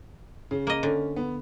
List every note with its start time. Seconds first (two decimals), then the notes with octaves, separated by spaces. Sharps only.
0.51 C#3
0.67 A#3 D#5
0.83 D3 C#4
1.16 B3